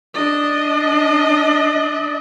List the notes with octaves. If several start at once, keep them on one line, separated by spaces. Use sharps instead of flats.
D4 D#5